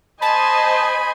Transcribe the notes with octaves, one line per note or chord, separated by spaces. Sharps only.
C5 D#5 G#5 A5 B5